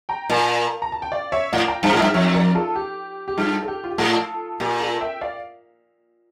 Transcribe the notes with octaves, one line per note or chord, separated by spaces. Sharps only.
G5 A#5
A#2 F5 A5
A#5
A5
G5
D5 F5
C#5 E5
A2 D5 F5
G5 A#5
G2 F5 A5
A2
G2 E5 G5
F2 C#5 E5
A#4 D5
F4 A4
G4
G4
G2 F4 A4
A4
G4
F4
G4
A2 F4 A4
A#2 G4
F4 A4
E5 G5
D5 F5